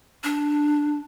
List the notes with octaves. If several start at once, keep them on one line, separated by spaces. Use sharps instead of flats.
D4